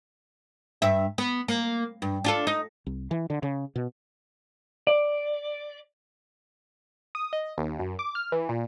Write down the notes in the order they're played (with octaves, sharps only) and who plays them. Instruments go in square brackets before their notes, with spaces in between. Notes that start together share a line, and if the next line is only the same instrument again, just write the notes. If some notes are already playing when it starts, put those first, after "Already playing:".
[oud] G2 E5
B3
A#3
G2
D4 F4 A4
D#4
[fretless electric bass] C2
E3
D3
C#3
B2
[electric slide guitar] D5
[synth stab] D#6
D#5
D#2
F#2
D6
F6
E3
A#2